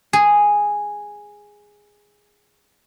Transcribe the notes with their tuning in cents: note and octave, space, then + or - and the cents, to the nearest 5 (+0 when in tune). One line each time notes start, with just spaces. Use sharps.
G#4 -5